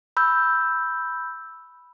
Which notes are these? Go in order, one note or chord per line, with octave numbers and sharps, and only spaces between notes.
B5 E6 G6